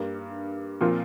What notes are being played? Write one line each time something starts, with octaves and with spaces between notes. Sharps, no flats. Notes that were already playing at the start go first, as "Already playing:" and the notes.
Already playing: G2 G3 A#3
A#2 F3 C4 F4 A#4